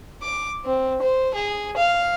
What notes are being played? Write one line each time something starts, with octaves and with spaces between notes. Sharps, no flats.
D6
C4
C5
G#4
F5